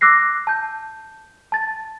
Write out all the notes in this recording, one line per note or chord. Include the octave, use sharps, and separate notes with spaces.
D6 E6 F#6 A#6 C7
A5 G6
A5 A6